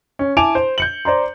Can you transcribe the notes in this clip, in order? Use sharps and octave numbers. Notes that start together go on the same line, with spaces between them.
C#4
E4 G#5 A5 D6 D7 F7
C5
G6 C#7 F#7
C5 D5 A#5 C6